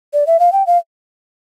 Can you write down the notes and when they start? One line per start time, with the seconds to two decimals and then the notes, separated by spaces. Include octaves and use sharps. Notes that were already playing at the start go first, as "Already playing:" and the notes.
0.13 D5
0.27 E5
0.40 F5
0.52 G5
0.67 F5